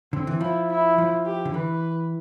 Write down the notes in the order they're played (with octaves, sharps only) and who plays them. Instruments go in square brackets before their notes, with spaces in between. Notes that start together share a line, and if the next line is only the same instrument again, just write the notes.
[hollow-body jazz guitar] D3 [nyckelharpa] C4
[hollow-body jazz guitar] E3
[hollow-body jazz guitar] F3 [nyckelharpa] E4
[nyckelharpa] E4
[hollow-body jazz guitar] F3
[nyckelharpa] G4
[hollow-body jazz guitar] D3
[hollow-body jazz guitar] E3 [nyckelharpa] B4